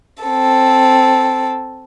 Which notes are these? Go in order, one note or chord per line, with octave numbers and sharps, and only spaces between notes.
C4 A4